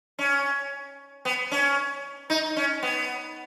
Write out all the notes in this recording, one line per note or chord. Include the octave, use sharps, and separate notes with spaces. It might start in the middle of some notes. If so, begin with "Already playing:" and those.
C#4
B3
C#4
D#4
C#4
B3